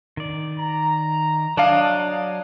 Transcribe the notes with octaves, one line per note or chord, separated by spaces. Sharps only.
D#3 D5
A#5
F#3 D4 C#5 D#5 F5